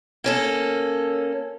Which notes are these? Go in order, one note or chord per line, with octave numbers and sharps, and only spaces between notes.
A#3 C#4 A4